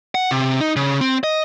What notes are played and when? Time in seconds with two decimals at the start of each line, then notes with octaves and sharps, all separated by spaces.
0.15 F#5
0.31 C3
0.60 D#4
0.76 C#3
1.01 C4
1.24 D#5